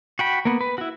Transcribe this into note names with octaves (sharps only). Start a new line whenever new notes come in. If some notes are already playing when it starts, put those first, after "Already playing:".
F#4 G5 B5
A#3 B3
B4
E4 F#4